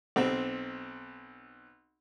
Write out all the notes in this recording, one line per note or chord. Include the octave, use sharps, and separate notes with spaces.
B1 C4